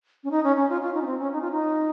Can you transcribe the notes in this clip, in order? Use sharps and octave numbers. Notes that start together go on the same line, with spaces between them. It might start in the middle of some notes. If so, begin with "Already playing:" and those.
C#4
D#4
C#4
C#4
F4
F4
D#4
C#4
C4
C#4
D#4
F4
D#4